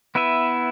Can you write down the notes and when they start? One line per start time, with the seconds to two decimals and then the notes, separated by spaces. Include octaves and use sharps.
0.15 B3 E4 B4 E5